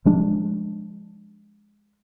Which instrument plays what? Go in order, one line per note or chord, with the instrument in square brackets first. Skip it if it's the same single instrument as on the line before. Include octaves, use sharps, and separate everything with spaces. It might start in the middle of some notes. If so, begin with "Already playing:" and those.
[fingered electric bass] F3 G#3 D4